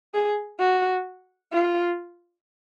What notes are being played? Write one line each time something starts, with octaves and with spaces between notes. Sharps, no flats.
G#4
F#4
F4